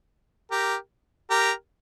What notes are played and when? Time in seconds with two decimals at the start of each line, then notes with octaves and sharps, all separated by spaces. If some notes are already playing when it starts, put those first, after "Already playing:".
0.51 G4 A#4
1.30 G4 A#4